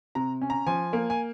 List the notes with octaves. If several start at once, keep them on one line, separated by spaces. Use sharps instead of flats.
C3 A#5
C#4
A#5
F3 G#5
A#3
G#5